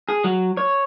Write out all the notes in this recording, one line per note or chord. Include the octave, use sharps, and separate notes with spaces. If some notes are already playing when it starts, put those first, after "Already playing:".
G#4
F#3
C#5